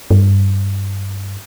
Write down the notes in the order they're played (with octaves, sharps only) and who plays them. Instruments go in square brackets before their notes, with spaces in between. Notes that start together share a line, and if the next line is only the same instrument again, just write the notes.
[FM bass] G2